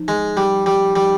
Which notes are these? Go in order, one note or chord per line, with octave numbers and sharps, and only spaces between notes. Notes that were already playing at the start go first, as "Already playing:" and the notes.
Already playing: F3 D#4
G#3
G3
G3
G3